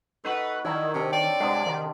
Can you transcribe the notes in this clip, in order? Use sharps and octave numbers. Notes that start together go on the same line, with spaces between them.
A3 D#4 F#4 B4
D#3 E4 A4 D5 D#5 C#6 G#6
C3 C4 D4
C#5 D5 G5
C3 G#3 D4 A4 F#5 C7
D#3